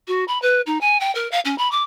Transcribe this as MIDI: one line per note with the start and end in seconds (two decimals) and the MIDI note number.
0.07 0.24 66
0.28 0.40 83
0.42 0.61 71
0.66 0.80 63
0.81 0.98 80
1.00 1.13 79
1.15 1.30 70
1.31 1.40 77
1.45 1.55 61
1.58 1.70 83
1.71 1.82 86